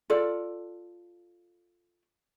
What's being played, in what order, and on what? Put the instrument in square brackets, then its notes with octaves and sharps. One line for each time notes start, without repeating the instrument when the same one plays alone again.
[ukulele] F4 A4 D5